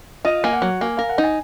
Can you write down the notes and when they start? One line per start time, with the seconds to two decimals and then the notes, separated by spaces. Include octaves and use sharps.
0.25 F4 D#5
0.44 A#3 G#5
0.52 F#5
0.62 F#3
0.81 A#3 G#5
0.97 A#4 F5
1.09 F#5
1.18 D#4
1.24 G#5